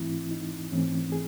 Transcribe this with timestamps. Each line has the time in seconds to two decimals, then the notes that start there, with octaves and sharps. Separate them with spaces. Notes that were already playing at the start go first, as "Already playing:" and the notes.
Already playing: G#2 E3 A3 C4 E4
0.31 D#4
0.72 G#2 E3 A3 C4 C#4
1.12 G#4